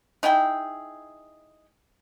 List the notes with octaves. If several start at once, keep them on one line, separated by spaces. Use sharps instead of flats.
D#4 E4 G#4 G5